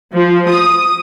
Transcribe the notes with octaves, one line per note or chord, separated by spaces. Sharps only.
F3
D#6